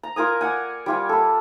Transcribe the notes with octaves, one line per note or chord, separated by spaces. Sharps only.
A#5
F4 A#4 G#5 D#6
D5 F#5 G#5
G3 F4 G#5
A4 B5